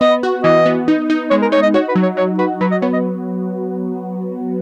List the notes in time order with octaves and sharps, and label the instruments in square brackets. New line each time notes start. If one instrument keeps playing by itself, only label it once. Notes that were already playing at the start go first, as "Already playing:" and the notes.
[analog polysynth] B3 [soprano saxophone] D#5
[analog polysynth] F#4
[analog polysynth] E3 [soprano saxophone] D#5
[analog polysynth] B3
D#4
D#4
[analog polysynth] G#3 [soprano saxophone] C#5
[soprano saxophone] A#4
[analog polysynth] D#4 [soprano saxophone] C#5
[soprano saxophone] D#5
[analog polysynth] F#4 [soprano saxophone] C#5
[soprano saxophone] B4
[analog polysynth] F#3
[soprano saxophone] C#5
[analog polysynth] F#3 [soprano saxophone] C#5
[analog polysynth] F#4 [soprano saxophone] B4
[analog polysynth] F#3 [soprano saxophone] B4
[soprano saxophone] D#5
[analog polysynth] B3 [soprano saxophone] C#5
[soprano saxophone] D#5